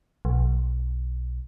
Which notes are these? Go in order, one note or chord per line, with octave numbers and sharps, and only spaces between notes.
B1